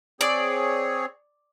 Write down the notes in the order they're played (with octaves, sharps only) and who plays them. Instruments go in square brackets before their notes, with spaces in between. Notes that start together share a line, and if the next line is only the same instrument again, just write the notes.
[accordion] C4 G#4 C#5 [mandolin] D5